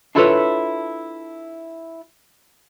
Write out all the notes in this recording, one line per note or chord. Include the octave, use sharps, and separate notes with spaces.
D4 E4 F4 A4 B4 C#5